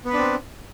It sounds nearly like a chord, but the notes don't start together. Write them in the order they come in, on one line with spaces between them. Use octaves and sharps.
B3 B4 D4 C4